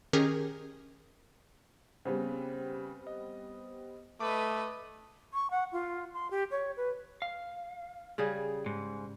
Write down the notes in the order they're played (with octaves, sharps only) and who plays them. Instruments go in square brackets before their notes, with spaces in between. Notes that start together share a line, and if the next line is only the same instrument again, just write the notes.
[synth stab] D#3 C#4 G4 G#4 A#4
[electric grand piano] C#3 [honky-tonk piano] G3 B3 C4
[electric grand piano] D#5
[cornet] A3 [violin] B4 D#5 [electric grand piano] D6
[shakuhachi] C#6
F#5
F4
C6
G4
C#5
B4
[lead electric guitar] F5
[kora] C#3 G3 G#4
[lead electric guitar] G#2